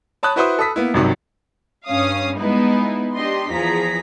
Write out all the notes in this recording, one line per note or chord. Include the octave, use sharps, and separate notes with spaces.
C#5 A5 B5 D#6 F#6
E4 F#4 B4 C5 E5 D#6
A4 B5 D#6 B6
A#3 B3 E4
G#1 G2 C3 D#3 F#3
G2 C#4 F5 D#6
G#3 B3 D#4 E4 B4
D4 G4 D#5 C6
E2 F3 G#4 A#5 B6